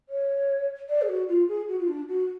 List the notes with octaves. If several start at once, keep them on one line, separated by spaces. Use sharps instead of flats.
C#5
D5
G#4
F#4
F4
G#4
F#4
F4
D4
F#4